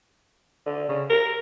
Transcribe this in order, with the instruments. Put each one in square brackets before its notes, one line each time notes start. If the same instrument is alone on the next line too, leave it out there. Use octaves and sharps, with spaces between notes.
[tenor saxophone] D3
C#3
A#4